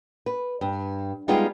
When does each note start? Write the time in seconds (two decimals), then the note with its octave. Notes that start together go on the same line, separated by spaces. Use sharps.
0.26 B4
0.61 G2
1.28 G3 G#3 B3 D#4 F4 G#4